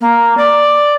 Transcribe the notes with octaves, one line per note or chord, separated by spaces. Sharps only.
A#3
D5